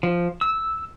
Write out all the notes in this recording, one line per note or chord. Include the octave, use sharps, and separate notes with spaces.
F3
E6